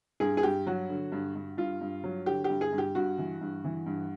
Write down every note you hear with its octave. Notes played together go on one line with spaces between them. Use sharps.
G2 G#4
G#4
G2 G4
F#3 F#4
D3
G2
G2
G2 F4
G2
F#3
D3 G4
G4
G2
G#4
G2
G4
G2 F#4
E3
G2
E3
G2